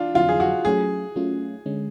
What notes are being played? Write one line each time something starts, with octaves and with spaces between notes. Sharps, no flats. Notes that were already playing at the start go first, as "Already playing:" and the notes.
Already playing: D4 F4
F2 D3 F#3 F4
G#4
F#4
F#3 A3 C#4 F4 G#4
F#3 A3 C#4 F4
D3 G#3 C#4